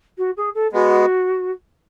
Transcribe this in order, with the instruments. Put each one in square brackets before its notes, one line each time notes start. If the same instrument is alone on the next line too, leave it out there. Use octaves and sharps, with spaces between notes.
[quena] F#4
G#4
A4
[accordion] G#3 B3 [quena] F#4